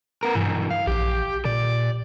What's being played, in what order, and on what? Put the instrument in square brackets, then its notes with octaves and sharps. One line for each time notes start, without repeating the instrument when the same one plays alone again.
[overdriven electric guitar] B3 A#4
[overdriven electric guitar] B1 E3 [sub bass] G2
[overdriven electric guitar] F5
[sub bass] A#1 [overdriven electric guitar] G4
[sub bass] A#2 [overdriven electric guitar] D5